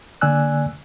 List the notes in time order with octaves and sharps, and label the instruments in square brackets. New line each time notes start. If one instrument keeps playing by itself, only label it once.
[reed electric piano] D3 A#3 D5 G#5 E6 F#6